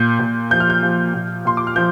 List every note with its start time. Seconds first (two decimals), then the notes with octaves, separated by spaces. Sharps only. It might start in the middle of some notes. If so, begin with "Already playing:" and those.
Already playing: A#2 G6
0.20 A#2
0.51 F3 G6
0.60 F6
0.70 G6
0.83 F3
1.14 A#2
1.45 A#2 C6
1.57 D6
1.67 F6
1.76 F3 G6